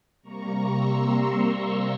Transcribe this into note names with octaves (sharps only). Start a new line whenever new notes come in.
C3 G3 A#3 A#5 C#6
C6 E6
A#5 C#6